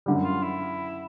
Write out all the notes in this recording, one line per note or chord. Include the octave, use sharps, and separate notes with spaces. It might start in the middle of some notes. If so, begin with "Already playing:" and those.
F#2 D3 G3
F4
E4